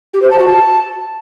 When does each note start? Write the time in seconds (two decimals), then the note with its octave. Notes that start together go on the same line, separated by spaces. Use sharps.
0.14 G4
0.22 C5
0.31 A5
0.39 F#4
0.47 A5